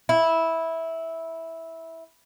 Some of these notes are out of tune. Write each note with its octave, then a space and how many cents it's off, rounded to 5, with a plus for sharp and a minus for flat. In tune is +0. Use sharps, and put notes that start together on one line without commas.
E4 -10